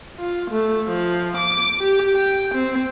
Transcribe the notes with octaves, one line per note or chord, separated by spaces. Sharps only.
F4
A3
F3
D6
G4
G5
C4